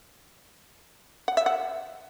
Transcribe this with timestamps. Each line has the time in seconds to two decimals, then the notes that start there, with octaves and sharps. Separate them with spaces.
1.28 F#5
1.37 E5
1.46 F#5